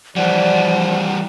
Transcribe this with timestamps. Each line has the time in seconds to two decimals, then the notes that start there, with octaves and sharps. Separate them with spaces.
0.16 E3 F3 G3 D5 F#5